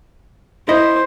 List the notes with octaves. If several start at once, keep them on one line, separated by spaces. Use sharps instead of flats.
E4 C5 D#5